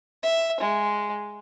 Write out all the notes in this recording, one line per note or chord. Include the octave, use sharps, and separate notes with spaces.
E5
G#3